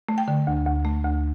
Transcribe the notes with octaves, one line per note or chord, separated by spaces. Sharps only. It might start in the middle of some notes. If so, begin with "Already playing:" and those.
A3
G5
D3
D2
D2
A3
D2